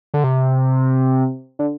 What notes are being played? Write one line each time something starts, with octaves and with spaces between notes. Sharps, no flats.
D3
C3
D3